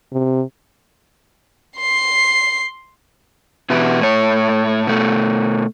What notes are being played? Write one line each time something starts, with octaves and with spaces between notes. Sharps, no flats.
C3
C6 C7
B2 E3 B3 E4 G4
A2 C#5
B2 A3